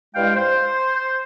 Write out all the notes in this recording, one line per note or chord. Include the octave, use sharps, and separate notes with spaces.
G2 G#3 E4 F5 G5
C5